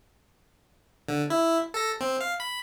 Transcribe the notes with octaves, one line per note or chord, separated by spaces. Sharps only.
D3
E4
A4 A#6
C4
F5
B5